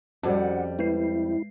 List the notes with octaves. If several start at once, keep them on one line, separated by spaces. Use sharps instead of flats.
F2 G3 C#4 F#4 C5 F#5
G#3 E4 B4 C7